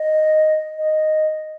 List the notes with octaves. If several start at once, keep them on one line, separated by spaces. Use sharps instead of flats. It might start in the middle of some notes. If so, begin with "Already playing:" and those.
Already playing: D#5
D#5